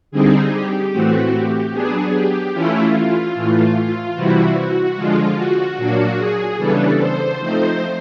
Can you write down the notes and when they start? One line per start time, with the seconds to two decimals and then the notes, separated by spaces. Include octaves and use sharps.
0.11 D3 G3 C4 D#4 G#4
0.52 G4
0.93 A2 E3 A3 C4 F#4
1.33 G4
1.73 F#3 B3 D4 G#4
2.14 G4
2.54 E3 A3 C#4 E4 F4
3.35 A2 E3 A3
3.76 F4
4.15 C3 E3 G3 C4 E4 F#4
4.56 F#4
4.96 D3 F3 G#3 F4
5.37 F#4
5.77 A#2 F#3 A#3 D4 F#4
6.18 G#4
6.58 C#3 E3 G3 B3 D4 A4
6.98 C5
7.39 F3 A3 C4 D#4